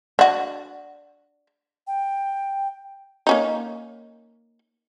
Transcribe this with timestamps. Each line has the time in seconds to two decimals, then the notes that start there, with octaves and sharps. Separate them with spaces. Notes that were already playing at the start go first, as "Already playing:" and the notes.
0.19 D4 F#4
1.87 G5
3.27 A#3 C#4 D#4